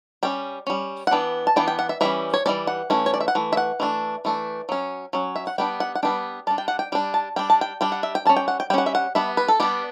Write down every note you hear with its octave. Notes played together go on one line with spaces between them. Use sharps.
G3 C#4 G5
G3 C#4
F#5
E3 B3 D4 G5
A5
E3 B3 D4 G5
G5
F#5
E5
E3 G3 C#4 E5
C#5
E3 G3 C#4 D5
F#5
E3 A3 C#4
C#5
D5
E5
F#5
E3 A3
E5
F#5
E3 A3 D4
E3 A3 D4
F#3 C#4
F#3 C#4
E5
F#5
G3 B3 D4 G5
F#5
F#5
G3 B3 D4 G5
G3 D4 A5
G5
F#5
G5
G3 D4 G5
A5
G3 D4 G5
A5
G5
G3 D4 G5
F#5
E5
G5
G3 C#4 A5
G5
F#5
G5
G3 C#4 F#5 G5
E5
F#5
G3 B3 D4 E5
B4
A4
G3 B3 D4 G4